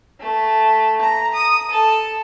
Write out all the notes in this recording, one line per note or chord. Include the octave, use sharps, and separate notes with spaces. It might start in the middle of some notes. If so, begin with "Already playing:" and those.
A3
A#5
D#6
A4